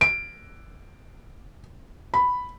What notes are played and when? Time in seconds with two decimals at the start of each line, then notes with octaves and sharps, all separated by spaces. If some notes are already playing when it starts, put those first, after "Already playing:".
0.01 D7
2.14 B5